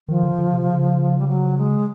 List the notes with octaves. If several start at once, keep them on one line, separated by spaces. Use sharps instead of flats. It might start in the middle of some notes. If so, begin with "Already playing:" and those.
D#3 F3
D3
D3
C3
C#3
G3
F#3
G#3